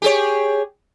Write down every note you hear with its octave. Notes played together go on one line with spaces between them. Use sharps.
G4 G#4 C#5